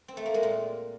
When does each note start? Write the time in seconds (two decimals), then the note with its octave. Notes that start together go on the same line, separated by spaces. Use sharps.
0.08 C4
0.17 A3
0.26 A#3
0.34 G#3
0.43 A#2